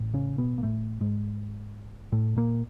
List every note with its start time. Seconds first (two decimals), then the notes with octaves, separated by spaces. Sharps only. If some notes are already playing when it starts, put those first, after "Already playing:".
Already playing: A1 A2
0.14 C#3 C#4
0.38 B2 B3
0.58 A#3
0.63 A2 A3
1.01 G#2 G#3
2.12 A2 A3
2.36 A#2 A#3